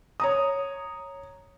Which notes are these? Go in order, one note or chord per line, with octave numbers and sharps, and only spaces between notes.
C#5 A#5 D#6